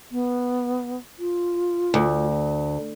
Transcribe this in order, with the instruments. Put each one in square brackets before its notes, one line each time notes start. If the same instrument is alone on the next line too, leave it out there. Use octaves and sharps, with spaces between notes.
[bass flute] B3
F4
[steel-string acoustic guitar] D2